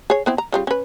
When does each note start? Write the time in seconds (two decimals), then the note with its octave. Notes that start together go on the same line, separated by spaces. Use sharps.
0.10 G#4 C#5
0.26 B3 C4 E4
0.38 A#5
0.52 C#3 G3 F4
0.67 C#4 B4